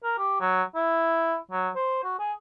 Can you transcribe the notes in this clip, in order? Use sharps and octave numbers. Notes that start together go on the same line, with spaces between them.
A#4
G4
F#3
E4
F#3
C5
F#4
G#4